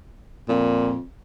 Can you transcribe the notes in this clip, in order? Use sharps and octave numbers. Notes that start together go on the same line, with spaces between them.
F2 A#2